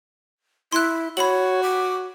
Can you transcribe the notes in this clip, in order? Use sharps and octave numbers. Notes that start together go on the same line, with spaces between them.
E4 C6 F#6
F#4 C#5 B5 F#7
D6